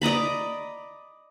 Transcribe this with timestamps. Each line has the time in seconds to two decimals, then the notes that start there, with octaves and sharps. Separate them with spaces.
0.02 D5 D#5 A#5 B5